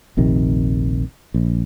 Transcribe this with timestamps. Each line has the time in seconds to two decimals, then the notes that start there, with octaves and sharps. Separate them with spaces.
0.17 F1 A#1 C3 D#3
1.34 A#1